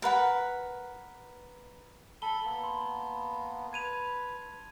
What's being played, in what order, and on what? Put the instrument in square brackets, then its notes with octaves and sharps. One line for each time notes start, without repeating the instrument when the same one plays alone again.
[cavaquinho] A#4 B4 F#5 B5
[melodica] A4 B5 [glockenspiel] A5 G7
[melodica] A#3 B3
[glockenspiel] C6
[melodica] B4 [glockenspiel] G#6 D#7 F7